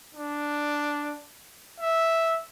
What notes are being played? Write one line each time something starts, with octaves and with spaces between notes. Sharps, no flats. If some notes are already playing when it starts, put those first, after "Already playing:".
D4
E5